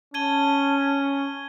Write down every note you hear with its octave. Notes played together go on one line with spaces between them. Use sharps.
C#4 A5 G#6 D#7 G7